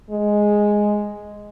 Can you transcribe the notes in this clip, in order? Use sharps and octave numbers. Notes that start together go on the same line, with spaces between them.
G#3